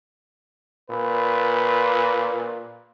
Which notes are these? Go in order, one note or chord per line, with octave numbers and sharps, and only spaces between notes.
A#2 B4